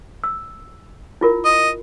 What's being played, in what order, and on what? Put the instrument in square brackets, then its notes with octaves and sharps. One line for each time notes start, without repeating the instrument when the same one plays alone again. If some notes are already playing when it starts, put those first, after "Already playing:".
[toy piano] E6
E4 F4 A#4
[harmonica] D#5